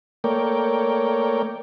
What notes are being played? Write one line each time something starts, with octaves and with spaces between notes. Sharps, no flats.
A3 A#3 A#4 C#5 D5 G5